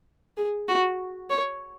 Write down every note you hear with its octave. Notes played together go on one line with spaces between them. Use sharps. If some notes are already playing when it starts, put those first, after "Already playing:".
G#4
F#4
C#5